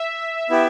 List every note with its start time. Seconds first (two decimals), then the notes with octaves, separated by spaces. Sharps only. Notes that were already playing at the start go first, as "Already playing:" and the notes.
Already playing: E5
0.50 B3 E4 G4